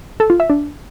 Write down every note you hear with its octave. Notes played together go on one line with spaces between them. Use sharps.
A4
F4
E5
D4